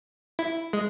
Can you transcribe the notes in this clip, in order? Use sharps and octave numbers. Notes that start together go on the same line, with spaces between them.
E4
G#3